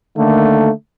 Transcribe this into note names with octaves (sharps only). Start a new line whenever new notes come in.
D3 D#3 A3 A#3